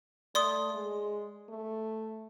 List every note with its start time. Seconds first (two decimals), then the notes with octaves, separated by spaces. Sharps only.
0.35 A3 D5 C6 D#6
0.74 G#3
1.49 A3